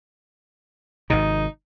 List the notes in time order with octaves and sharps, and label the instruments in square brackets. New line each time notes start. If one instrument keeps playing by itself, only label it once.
[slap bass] G#1 G#2 C3 [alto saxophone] D#4